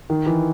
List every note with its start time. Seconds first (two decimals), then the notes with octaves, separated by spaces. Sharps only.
0.10 D#3
0.26 E3